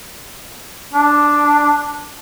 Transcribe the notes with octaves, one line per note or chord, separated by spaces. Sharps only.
D4